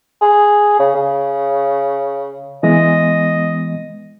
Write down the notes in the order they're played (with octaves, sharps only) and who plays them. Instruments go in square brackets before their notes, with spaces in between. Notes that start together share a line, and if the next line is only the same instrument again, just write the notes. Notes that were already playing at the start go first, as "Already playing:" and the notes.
[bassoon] G#4
C#3
C#3
[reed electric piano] E3 G#3 B3 [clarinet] D#5